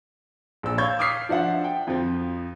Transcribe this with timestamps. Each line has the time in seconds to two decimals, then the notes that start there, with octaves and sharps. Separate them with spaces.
0.63 A#1 E6
0.78 C#5 F5 C#6 E6 G6 G#6
0.99 D6 D#6 F6 B6 C7
1.29 F3 D4 E5 F#5
1.64 G5
1.87 F2 F3